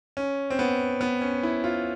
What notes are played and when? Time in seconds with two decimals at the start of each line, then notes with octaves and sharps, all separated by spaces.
0.17 C#4
0.50 C4
0.59 B3
1.01 B3
1.21 C#4
1.43 E4
1.64 F4